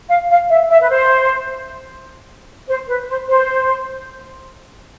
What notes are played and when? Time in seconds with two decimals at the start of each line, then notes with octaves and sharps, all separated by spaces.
0.09 F5
0.30 F5
0.49 E5
0.70 E5
0.81 B4
0.89 C5
2.68 C5
2.87 B4
3.08 C5
3.28 C5